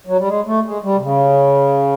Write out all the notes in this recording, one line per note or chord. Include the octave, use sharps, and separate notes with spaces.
F#3
G3
G#3
A3
G#3
G3
C3
C#3